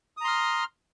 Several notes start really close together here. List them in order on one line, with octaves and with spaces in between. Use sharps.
D#6 A#5 C6 F6